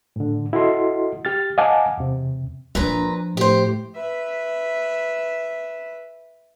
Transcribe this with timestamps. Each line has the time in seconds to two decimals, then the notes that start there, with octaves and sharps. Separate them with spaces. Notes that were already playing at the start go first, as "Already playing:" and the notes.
0.16 A2 D3
0.53 E4 F#4 A4 D#5 C6
1.25 G4 F6 A6
1.58 D#5 F5 F#5 G#5 A5 D6
1.97 E2 C3
2.75 A#2 F3 D4 B4 A#5
3.37 A2 G4 C5
3.95 B4 E5